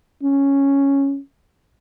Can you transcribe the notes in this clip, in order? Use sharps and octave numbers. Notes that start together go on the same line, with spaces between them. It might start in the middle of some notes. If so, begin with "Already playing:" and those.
C#4